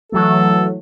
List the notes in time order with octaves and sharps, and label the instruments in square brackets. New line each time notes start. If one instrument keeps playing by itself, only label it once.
[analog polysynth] E3 F#3 A3 [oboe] A4